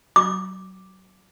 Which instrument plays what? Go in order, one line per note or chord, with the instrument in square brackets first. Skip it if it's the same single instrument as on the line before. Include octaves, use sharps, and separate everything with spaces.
[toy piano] D6